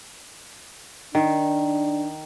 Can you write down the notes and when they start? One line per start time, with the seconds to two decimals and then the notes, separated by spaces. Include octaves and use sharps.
1.15 D#3 D4